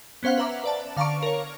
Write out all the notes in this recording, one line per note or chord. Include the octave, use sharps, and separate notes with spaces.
B3 C#4 C5 F5 F#5
B4 E5 A#5 D6
B4 D5 A5
D3 F5 A5 A#5 C#6 D7
A#4 C#5